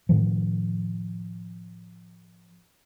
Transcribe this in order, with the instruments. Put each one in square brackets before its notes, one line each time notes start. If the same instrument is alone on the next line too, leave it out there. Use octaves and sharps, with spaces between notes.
[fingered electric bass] A2 D#3 F3